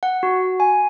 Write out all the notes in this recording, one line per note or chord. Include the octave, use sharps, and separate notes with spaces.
F#5
F#4
G#5